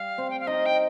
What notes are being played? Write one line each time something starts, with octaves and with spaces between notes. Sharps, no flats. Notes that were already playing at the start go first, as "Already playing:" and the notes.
Already playing: G3 F5
C4
G5
F5
D#4 D#5
G5